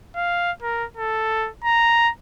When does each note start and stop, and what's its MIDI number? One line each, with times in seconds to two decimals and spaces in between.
0.16 0.52 77
0.62 0.85 70
0.97 1.49 69
1.65 2.10 82